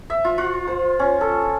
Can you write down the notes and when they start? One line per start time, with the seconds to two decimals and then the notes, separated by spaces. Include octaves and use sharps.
0.10 E5
0.25 F4
0.38 F4
0.67 C5
0.99 C#4
1.21 A4